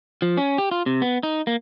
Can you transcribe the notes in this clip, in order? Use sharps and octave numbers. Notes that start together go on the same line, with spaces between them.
F3
C#4
G4
F4
C3
B3
D#4
A#3